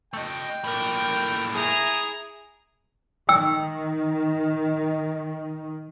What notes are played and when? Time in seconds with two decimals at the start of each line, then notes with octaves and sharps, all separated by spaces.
0.13 A3 D#5 G5
0.64 A2 A#3 A#4
1.54 E4 G#4 A#5
3.29 D#3 G5 E6